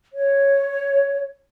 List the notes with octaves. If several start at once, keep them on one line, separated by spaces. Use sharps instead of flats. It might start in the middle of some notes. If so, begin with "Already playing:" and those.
C#5